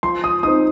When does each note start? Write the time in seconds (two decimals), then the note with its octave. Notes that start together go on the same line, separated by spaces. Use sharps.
0.03 F3 C6
0.24 D#6
0.43 C4 D#4 D#6